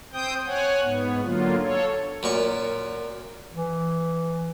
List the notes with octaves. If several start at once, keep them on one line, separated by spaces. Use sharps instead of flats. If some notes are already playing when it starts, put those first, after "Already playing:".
C4 C5 G5 D#6 G6
C#5 F#5 G#5
G#2 B3
D3 F#3 A#3 F4
A4 C#5
F#2 A#2 C#6
E3